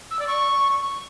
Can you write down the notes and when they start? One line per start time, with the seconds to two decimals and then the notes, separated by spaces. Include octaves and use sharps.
0.11 E6
0.19 D5
0.28 C#6